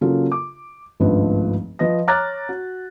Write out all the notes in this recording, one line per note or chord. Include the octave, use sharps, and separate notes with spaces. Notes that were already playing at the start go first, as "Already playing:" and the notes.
C#3 F#3 A#3 F4 A4
D6
G#1 C#2 G2 F3 A3 B4
F3 B4 D#5 A#6
C#5 A#5 D6 F6 F#6 A6
F#4